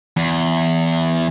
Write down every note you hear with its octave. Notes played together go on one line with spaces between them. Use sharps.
E2